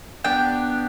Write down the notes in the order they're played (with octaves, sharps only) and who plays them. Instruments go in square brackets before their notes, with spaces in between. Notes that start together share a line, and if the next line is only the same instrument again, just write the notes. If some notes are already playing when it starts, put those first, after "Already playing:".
[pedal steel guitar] B3 D4 G4 [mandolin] G5